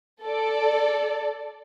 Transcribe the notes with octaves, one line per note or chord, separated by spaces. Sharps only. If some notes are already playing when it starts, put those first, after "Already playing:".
A4 D5